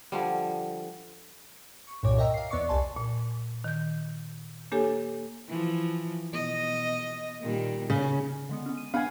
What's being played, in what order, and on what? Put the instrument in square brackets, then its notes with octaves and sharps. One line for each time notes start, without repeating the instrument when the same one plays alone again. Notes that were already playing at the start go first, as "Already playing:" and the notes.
[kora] D3 F3 G3
[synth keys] C#6
C2 G2 A#2 C#5 D6
A#4 D#5 E5 G5 A#5 E6
F5 C7
E2 B3 D5 C#6 D6 C#7
C2 D5 G#5 A5 C6
[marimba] A#2
D#3 G6
A#3 D4 G4 A4 C#5 G#5
[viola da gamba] E3 F3
B2 D#5
A#2 D#3 G3
[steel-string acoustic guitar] C#3 [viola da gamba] C#4
[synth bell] D3 G#3 B3
B3 C#4
D#7
[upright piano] B3 [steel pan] F5 G#5 [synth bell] F#5 B5